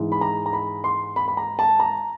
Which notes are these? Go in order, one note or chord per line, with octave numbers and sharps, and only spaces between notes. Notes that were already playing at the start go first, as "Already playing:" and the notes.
Already playing: G#2 E3 G#3
B5
A#5
A#5
B5
C6
B5
B5
A#5
A5
A#5